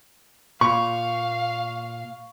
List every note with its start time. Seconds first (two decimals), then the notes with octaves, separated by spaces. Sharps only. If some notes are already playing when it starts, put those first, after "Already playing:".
0.61 A#2 F5 B5 C#6